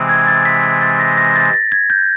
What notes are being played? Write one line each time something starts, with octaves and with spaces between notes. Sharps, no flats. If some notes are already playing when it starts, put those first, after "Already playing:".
Already playing: C3 E3 G#3 C4
G#6
A6
B6
A6
A#6
A#6
A6
A6
G#6
G6